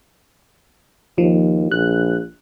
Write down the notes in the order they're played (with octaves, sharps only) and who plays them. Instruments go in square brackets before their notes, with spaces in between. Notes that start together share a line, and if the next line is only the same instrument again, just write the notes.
[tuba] D#2 [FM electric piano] F3
[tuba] A#1 [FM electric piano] F#6